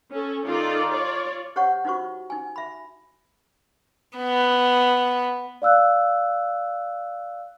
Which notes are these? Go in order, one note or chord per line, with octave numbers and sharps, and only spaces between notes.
C#4 A4
D#3 D#4 F4 A4 D5 A#5
F4 C#5 D5
G4 C5 C#5 F#5 C#6
D#4 F4 F#4 C5 C#6
D#4 G#5
E5 B5
B3
D5 F5 E6 F#6